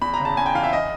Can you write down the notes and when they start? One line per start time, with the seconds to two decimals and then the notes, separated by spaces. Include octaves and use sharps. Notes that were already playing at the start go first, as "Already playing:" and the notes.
0.01 E2 B5
0.14 A#5
0.20 C#3
0.25 A5
0.37 E2 G#5
0.46 G5
0.55 E3 F5
0.63 E5
0.73 D#5